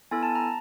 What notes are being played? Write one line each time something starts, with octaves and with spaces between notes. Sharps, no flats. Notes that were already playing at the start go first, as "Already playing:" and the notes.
B3 E4 A4 G#5
A5
A#5